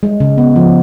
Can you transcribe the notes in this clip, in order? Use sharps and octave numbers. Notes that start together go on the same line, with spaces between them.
G#3
C#3
B3
F3